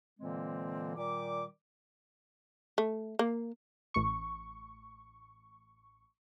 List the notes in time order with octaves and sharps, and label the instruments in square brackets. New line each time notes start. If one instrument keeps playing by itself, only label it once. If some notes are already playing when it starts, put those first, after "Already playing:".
[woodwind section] A#2 D3 E3 G#3 A#3 C4
A#2 D#3 G3 D6
[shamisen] A3
A#3
[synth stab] A1 C#6